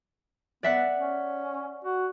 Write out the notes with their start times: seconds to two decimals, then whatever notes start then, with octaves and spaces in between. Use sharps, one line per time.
0.63 B3 D5 E5 F#5
0.96 C#4
1.84 F#4